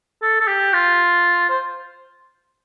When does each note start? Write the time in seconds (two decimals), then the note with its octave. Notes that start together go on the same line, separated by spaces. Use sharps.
0.22 A4
0.41 A4
0.47 G4
0.73 F4
1.50 C5